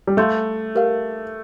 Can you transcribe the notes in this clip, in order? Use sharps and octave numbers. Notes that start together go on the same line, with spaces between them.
G3
A3 F5 C6 G6
G4 A#4 F5